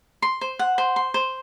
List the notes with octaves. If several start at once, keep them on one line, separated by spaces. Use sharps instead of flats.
C6
C5
F#5
C5
C6
C5